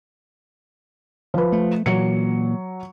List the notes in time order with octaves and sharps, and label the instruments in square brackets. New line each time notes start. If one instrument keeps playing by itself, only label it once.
[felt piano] F3 B4
[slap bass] A3
[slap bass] A#2 E3 A#3 [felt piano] F#3 C#7